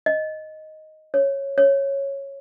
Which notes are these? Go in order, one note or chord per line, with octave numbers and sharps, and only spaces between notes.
D#5
C#5
C#5